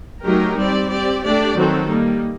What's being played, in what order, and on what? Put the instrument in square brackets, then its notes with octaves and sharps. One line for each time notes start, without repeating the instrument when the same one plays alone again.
[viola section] F#3 A3 D#4 G4 A#4
G3 C4 G4 D5
C4 G4 D5
A3 D4 G4 D5
D#3 F#3 C4 F#4 A4
G3 A#3 D#4